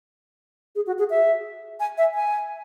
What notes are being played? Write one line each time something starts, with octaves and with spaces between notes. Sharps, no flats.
G#4
F#4
G#4
E5
G#5
E5
G#5